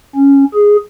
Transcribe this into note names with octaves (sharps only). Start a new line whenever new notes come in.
C#4
G#4